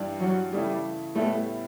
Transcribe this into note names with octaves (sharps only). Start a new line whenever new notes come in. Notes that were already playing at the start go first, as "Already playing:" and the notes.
Already playing: G2 E3 G3 D4
F#3
C#3 E3 G3 A3 E4
A2 G3 A3 B3 E4